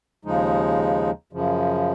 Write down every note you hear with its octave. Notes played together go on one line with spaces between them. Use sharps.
D#2 C#3 F3 G#3 D#4
F#2 C#3 F3